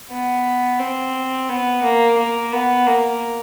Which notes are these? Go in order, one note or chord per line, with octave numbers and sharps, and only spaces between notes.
B3
C4
B3
A#3
A#3
B3
A#3